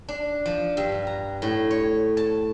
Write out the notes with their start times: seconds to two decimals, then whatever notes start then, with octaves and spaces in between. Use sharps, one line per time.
0.09 D4
0.46 F3
0.77 G2
1.07 A#5
1.42 A2
1.71 C#5
2.17 A5